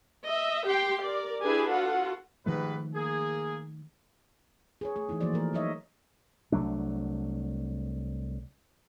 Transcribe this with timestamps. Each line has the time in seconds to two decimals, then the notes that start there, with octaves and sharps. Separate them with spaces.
0.25 D#5 E5
0.65 G4 G5 C6
1.03 A#4 D5
1.42 D4 E4 G4 G#4 B4 G#5
1.70 F4 F#4 A4 F#5
2.46 G#2 D#3 F3 A3 G4 B4
2.95 A#3 G#4
4.81 G#4 B4 C#5
4.96 A3 G#4
5.09 E3 A3 D#4 E4
5.21 E3 F3 A#3 F#4 C5 D5
5.33 E3 A3 A#4
5.53 F#3 A3 D#4 C#5 D#5 E5
6.52 C2 F#3 A3 D4